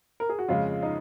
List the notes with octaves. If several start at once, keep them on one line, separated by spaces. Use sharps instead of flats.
A#4
G#4
F#4
F2 C#3 G#3 F4
D#4